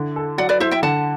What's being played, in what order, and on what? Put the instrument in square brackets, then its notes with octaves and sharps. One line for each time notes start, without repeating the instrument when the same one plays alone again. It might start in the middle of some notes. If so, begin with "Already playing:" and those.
Already playing: [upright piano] D3 E4
A4
[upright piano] F#3 [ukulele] D5 F#5
[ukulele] B4 D5
[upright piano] E4 [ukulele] C5 E5
[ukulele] E5 G5
[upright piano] D3 [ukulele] F#5 A5